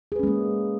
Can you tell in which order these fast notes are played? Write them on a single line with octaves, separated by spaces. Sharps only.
G#4 B4 C#4 G#3 A#3